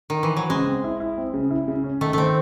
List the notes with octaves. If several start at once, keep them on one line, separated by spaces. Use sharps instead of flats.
D#3
E3
F#3
C#3 G#3
C4
E4
E4
C4
C#3
E4
C#3
C#4
D#3 A3
D#3 A3 C4